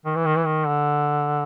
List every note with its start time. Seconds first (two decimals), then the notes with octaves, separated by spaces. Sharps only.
0.06 D#3
0.16 E3
0.25 D#3
0.36 E3
0.46 D#3
0.68 D3